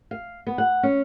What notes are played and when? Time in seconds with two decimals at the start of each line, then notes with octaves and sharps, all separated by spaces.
0.11 F5
0.47 B3
0.58 F#5
0.83 C#4